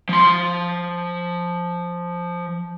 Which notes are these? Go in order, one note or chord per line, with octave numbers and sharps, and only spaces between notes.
F3 C6